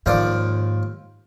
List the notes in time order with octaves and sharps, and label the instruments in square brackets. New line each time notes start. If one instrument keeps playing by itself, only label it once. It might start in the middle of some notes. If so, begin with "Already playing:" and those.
[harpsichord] D#2 F3 D5 [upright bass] G#2